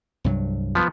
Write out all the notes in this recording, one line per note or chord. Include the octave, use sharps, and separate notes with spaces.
C2 G2 F#3
F3 B3